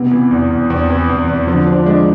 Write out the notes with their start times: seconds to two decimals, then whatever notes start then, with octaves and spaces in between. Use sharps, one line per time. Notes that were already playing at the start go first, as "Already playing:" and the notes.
Already playing: C3 B3
0.11 E3
0.31 E2
0.51 E2
0.70 E2 C4
0.90 E3
1.09 E2
1.28 E2
1.47 D3 F3
1.67 F3 D4
1.86 G#3 D4